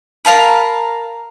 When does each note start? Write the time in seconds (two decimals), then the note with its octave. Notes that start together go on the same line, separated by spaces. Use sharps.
0.25 A#4 F5 A5 B5